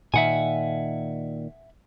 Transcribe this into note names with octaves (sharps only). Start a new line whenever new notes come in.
A#2 D#3 E5 F#5 G#5